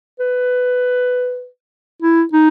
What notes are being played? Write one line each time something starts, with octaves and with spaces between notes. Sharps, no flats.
B4
E4
D#4